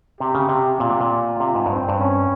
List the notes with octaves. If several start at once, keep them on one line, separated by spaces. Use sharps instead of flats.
C3 G4
C#3
C3
A#2 F4
C3
A#2
C3
G#2
G2 C4
G2
C#4